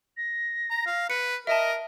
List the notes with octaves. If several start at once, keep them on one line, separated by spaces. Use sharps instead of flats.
A#6
A#5
F5
B4 C#7
A#4 D#5 E5 A5